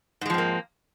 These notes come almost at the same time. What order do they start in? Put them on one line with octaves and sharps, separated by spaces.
G#2 G#3 F3 C4 A#3